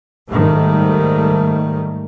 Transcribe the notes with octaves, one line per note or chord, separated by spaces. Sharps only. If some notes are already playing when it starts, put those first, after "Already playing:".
G#2 D#3 G3 A3